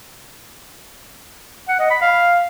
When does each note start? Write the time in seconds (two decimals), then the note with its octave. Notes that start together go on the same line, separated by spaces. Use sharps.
1.68 F#5
1.79 D#5
1.91 B5
2.02 F5